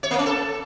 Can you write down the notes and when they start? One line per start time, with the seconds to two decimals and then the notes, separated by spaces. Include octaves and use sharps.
0.03 C#5
0.11 A#3
0.18 C#4
0.26 A4